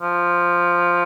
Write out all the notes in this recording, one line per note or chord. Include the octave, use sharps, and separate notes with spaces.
F3